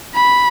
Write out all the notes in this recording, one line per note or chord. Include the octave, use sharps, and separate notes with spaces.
B5